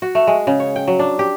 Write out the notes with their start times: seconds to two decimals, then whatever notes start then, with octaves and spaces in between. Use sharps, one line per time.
0.02 F#4
0.15 A3
0.27 G#3
0.47 C#3
0.60 C#5
0.76 G5
0.88 F#3
0.99 D4
1.19 G4